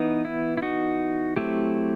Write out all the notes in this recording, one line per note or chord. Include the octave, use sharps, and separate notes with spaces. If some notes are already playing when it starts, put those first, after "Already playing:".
Already playing: E3 B3 D#4
E4
E4
D#4 F#4
F#3 A3 C4 E4 G4